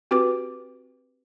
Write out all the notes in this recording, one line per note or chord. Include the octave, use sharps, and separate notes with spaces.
C4 F#4 G4 B4 D6